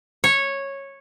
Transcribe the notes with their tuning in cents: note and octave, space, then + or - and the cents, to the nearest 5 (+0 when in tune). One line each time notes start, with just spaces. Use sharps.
C#5 -10